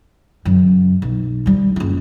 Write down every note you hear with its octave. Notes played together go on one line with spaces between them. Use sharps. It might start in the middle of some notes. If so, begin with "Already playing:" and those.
F#2 C#3
B1
F3 G3
F#1 F4